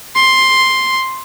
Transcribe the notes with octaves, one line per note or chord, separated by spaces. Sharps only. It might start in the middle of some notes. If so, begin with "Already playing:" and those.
C6